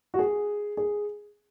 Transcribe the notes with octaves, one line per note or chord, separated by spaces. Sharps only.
F#4
G#4
G#4